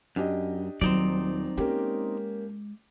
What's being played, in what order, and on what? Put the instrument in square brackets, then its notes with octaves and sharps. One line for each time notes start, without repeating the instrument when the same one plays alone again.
[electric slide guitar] F#2 [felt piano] D4 G4 D#5
[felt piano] D#1 [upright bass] F#3 [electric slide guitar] C4 D#4 D5
[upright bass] G#3 [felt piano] A#3 C#4 G4